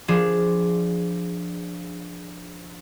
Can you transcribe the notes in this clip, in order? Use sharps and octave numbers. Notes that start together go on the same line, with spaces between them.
F3 D4 G#4